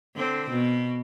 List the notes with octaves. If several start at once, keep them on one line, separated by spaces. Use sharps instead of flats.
D3 C4
B2